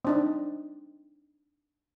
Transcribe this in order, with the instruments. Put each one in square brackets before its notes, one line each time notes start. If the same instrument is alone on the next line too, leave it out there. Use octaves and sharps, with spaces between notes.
[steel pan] C4 D4 D#4